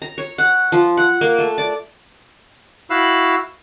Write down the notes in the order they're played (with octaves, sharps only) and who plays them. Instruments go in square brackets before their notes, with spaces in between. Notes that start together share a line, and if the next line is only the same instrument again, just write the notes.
[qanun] A#5
C#5
F#5
F3
F#5
A#3
A3
D5
[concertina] E4 F#4 F5 B5 E6 F#6